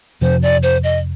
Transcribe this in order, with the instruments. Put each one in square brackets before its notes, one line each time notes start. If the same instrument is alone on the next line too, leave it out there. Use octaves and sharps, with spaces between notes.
[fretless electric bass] F2 C3 F3 [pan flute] C5
[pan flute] D5
C5
D#5